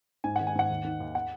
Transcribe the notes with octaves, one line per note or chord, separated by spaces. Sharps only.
G#2 G#5
D#3 F#5
G#5
G#2 F#5
D#2
D#3
D#2
F#5